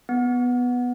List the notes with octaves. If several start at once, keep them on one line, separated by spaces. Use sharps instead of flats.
B3